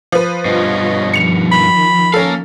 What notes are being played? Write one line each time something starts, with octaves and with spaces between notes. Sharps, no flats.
F3 B4
G2 B2 F4 C#5 D#5
D#3 F3 C#7 F7
B5
A#3 C#4 A4 F5